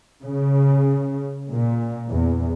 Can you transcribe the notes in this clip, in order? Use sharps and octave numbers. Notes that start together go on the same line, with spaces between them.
C#3
A#2
E2